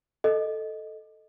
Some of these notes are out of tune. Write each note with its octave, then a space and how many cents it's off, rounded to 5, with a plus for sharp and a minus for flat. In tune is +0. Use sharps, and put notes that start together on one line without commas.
A4 +0 D#5 +0